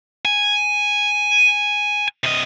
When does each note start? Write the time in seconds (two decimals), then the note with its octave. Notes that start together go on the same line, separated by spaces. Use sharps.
0.25 G#5
2.24 C3 D#5